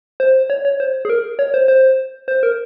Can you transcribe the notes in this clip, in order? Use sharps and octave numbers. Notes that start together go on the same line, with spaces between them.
C5
C#5
C#5
C5
G#4
A#4
C#5
C5
C5
C5
A#4